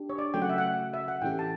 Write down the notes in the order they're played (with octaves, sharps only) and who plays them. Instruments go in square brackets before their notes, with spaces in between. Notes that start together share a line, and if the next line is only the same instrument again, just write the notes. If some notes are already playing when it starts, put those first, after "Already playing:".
Already playing: [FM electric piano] D4 G4
[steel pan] C#5
D5
[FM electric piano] C#3 F#3 A3 [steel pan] G5
[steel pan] F#5
E5
F#5
E5
F#5
[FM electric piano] A2 E3 A3 C#4 G4 [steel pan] G5
[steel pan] A5